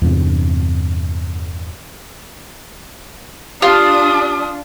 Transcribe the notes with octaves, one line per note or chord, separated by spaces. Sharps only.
E2 G2 C3
D4 F4 G4 D#6